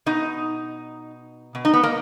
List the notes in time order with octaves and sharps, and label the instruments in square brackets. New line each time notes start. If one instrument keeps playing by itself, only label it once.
[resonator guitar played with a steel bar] B2 D#4
B2
D#4
B3
A#3